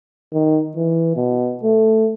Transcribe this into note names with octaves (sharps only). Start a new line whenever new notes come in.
D#3
E3
B2
A3